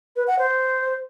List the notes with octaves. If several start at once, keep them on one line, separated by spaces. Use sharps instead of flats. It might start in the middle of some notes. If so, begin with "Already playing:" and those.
B4
F#5
C5